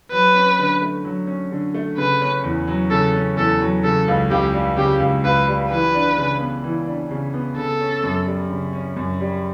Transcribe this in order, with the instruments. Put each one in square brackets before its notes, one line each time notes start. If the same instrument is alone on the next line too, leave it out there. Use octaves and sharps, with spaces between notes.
[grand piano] F#3 [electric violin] B4
[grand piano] C#4
D3
A3
F#3
C#4
D3
A3
[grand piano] C#3 [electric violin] B4
[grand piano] C#4
E2
F#3
[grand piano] C#3 [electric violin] A4
[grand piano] C#4
[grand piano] E2 [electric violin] A4
[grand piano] F#3
[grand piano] C#3 [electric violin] A4
[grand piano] C#2
[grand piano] C#2 [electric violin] G4
[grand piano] G3
[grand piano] C#3 [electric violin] G4
[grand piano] C#2
[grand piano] C#2 [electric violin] B4
[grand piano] G3
[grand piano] E3 [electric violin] B4
[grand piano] D4
C#3
B3
E3
D4
C#3
B3
[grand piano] C#3 [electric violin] A4
[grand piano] C#4
F#2
G3
C#3
C#4
F#2
G3